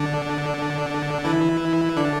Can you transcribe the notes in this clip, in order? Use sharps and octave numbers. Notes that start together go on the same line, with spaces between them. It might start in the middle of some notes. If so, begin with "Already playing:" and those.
Already playing: D3 D4
E3 E4
D3 D4